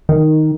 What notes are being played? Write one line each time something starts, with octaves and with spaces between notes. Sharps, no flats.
D#3